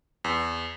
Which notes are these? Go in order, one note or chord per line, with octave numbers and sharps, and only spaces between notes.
E2